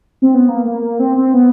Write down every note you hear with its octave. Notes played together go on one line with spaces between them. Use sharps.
C4
B3
A#3
A#3
A#3
C4
C4
B3